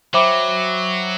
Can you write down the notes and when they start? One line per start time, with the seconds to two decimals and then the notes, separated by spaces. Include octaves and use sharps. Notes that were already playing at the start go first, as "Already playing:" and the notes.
0.14 F#3 C5 E5 G5 B5 D6